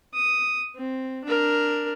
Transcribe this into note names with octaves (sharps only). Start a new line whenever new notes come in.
D#6
C4
D4 A#4